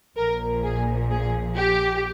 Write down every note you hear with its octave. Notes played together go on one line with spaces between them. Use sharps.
A#1 A#2 F3 A#4
G#4
G#4
G4